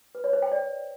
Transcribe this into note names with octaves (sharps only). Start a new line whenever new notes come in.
B4
C#5
C5
G5
D5